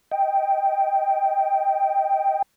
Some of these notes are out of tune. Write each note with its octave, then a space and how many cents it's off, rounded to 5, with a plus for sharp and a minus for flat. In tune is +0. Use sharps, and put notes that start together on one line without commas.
D#5 +15 G5 +0